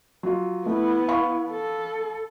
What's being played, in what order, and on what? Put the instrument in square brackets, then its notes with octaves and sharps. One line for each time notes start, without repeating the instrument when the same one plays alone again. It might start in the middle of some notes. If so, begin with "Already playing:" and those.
[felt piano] F#3 F4
[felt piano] A3 [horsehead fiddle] B3 E4
[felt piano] F5 B5 C#6
[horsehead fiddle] A4